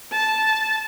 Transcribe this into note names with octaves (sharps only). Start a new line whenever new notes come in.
A5